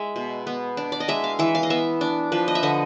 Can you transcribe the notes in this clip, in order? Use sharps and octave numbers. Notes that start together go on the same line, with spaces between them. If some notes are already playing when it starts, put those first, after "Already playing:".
Already playing: G#3 E5
B2
B3
D4
D5
D#5
G#3 E5
F5
E3 E5
F5
D#5
B3 E5
D4
F3 B4
D#5
E5
D3 D#5